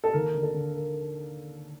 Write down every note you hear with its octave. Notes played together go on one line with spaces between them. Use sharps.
A4
D#2 A#4
D3
A4
D3
A#4